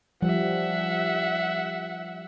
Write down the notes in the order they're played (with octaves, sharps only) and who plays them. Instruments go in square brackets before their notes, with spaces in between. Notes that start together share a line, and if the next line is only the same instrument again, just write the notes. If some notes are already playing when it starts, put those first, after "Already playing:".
[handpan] F3 G3 [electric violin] E5 F#5